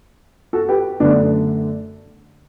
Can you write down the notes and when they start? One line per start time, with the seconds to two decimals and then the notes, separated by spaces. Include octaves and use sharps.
0.53 F#4 A4
0.69 G4 B4
1.00 F#2 D3 A3 B3 D4